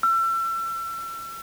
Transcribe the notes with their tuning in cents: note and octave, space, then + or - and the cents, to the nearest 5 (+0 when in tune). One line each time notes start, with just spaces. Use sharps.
E6 +35